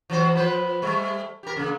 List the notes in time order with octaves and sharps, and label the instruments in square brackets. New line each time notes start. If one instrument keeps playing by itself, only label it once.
[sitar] E3 F#3 C5
F3 B4 C5
G3 A3
G4 A#4
C#3 A#3